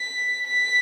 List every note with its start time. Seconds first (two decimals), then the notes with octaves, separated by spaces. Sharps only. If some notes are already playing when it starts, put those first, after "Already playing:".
Already playing: B6
0.47 B6